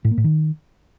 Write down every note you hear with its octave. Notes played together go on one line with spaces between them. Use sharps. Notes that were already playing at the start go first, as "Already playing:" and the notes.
A2
A#3
A2
D#3